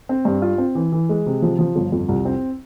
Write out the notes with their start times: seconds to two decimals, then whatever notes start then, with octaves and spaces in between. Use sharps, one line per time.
0.09 C4
0.25 G2
0.42 F4
0.58 C4
0.75 E3
0.92 E3
1.09 G#3
1.26 C3
1.42 F3
1.59 F3
1.75 G1
1.92 F2
2.09 C2
2.25 C4